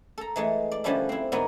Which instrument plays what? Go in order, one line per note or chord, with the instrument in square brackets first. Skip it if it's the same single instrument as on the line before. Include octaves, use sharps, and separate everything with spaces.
[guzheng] A4 A#5
E3 G#3 A3
D5
D3 F3 G3 C#4 D4 E4
C4 E4
G#2 D3 B3 A#4 D#5